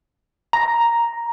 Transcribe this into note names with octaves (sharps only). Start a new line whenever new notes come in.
A#5